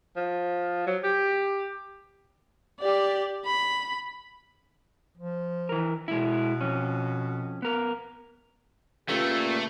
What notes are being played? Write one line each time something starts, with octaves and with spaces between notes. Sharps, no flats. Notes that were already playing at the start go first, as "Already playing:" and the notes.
F3
F#3
G4
G4 D5
B5
F3
E3 A#4
B2 G#3 E4
F2 C#4
B3 A#4
A#2 C#3 A3 F4 G4 A4 B4